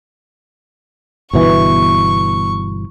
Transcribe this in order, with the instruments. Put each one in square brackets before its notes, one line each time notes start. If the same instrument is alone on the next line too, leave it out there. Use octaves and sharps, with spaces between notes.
[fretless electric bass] G1 B2 E3 [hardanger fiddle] C#6